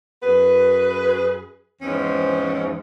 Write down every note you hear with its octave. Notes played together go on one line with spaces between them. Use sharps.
F#2 G#4 B4
E2 G#2 F3 C4 C#4